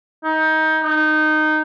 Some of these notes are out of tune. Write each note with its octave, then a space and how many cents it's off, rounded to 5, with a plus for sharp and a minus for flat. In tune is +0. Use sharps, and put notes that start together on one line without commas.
D#4 +20
D#4 -15